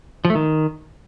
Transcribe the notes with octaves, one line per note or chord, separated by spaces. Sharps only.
F3
A3
D#3